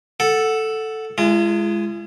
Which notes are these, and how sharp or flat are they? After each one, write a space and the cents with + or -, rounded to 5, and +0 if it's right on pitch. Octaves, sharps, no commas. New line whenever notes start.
A4 +0 F#5 +0
G#3 +0 F4 -45 A5 +45